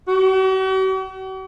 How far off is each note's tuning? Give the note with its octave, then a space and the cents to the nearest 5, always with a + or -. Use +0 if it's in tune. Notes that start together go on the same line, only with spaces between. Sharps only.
F#4 +45